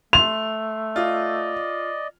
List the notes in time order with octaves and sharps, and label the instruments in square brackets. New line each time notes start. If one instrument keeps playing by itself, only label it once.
[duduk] A3 [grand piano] C6 [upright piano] F7
[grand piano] F4 [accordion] D5 D#5